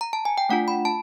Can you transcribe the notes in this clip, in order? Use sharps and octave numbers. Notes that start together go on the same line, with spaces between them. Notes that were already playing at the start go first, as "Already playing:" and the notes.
A#5
A5
G#5
G5
A3 D4 F4 F#5
B5
A5